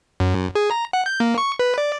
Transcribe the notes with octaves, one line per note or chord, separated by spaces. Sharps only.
F#2
G#4
A#5
F#5
G6
A#3
C#6
B4
D5